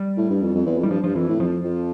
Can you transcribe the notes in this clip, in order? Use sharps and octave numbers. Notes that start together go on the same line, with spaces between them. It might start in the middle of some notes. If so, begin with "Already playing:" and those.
Already playing: G3
A2
G2
F2
F2
E2
F2
A2 G3
G2 F3
G2 F3
F2 E3
A2
F2 F3
F2